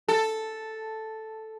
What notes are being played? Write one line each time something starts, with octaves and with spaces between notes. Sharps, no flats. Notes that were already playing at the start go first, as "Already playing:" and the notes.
A4